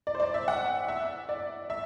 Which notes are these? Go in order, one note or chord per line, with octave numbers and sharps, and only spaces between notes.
D5
C5
D5
E5
F#5
E5
D5
E5